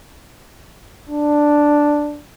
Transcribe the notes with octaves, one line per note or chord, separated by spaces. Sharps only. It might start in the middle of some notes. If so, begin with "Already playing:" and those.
D4